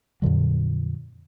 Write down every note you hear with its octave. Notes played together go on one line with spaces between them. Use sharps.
F2 A#2 D3 F#3